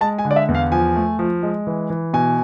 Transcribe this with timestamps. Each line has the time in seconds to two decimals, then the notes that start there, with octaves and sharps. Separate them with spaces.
0.01 G#3 A5
0.19 G#5
0.25 D3
0.31 D5
0.36 E5
0.48 E2
0.55 F5
0.72 F3 G#5
0.96 A3
1.19 F3
1.43 G#3
1.67 E3
1.90 E3
2.13 B2 G#5